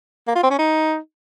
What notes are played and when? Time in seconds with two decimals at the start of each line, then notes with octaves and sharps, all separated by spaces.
0.28 A#3
0.35 F4
0.43 C4
0.51 C#4
0.59 D#4